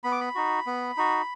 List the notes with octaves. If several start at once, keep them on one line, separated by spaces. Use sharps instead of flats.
B3 B5
D6
B5
D#4 F#4
B3
D#4 F#4